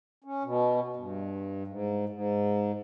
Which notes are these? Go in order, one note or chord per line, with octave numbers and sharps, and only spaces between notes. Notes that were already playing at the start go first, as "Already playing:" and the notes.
C#4
B2
G2
G#2
G#2